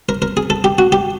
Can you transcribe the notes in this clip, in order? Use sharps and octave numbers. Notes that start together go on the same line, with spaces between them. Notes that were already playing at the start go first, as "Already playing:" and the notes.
A#4
A#4
G#4
A4
G4
F#4
G4